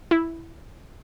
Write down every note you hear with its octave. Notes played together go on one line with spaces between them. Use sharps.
E4